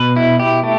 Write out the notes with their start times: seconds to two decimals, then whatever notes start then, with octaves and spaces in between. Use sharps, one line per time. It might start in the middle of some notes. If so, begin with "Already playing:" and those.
Already playing: B2 B4
0.16 E4
0.39 G4
0.63 A3